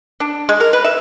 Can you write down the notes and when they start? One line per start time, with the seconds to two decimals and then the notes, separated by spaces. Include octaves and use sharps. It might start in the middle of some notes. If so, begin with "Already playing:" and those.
0.20 D4
0.49 G#3
0.60 A#4
0.73 B4
0.84 E5